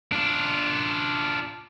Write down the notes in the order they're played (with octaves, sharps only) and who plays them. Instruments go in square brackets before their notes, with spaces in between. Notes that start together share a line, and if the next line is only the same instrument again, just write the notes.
[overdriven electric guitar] D4 F4